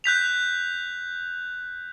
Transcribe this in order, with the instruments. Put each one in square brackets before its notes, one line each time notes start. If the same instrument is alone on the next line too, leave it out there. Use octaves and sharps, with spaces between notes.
[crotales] F#6 G6 B6 F7